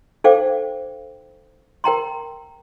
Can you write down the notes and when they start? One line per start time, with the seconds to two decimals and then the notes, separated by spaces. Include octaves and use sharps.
0.24 D#4 A4 C5 F5 G5 D6
1.84 A#4 G5 A#5 C6